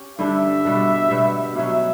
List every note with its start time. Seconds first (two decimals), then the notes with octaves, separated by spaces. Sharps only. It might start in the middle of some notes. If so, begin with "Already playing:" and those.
Already playing: C#4 G4
0.18 G2 D3 G3 D4 E5
0.65 B2 G3 B3 D4
1.11 B2 G3 B3
1.56 B2 F#3 C#4 E5